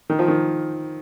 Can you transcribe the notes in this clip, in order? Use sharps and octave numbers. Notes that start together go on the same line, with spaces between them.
D#3
F3
D#3